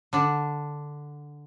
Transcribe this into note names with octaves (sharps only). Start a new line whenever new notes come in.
D3 D4